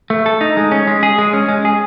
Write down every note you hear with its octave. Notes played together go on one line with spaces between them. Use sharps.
A3
A4
D#4
G#3
C#4
G#3
G#4
G#3
C#4
G#3
G#4